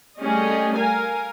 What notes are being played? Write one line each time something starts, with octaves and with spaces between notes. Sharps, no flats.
G3 A3 C#4 G#4 D#5
A#4 F5 G#5